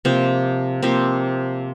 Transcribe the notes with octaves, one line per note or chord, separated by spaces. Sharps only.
C3 F3 A#3 C4
C3 F3 A#3 C4